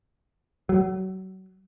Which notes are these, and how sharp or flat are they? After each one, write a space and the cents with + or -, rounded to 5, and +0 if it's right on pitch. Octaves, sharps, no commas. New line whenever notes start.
F#3 +30